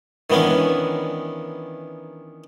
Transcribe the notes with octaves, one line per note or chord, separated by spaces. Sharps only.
D#3 E3 B3 C#4 D4